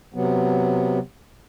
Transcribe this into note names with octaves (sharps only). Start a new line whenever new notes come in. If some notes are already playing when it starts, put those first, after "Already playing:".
C3 F#3 B3